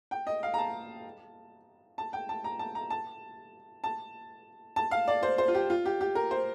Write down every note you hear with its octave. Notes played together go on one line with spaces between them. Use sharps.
G5
D#5
F5
A#5
A5
A5
G5
A5
A#5
A5
A#5
A5
A5
A5
F5
D5
C5
C5
F4
G4
F4
G4
G4
A#4
C5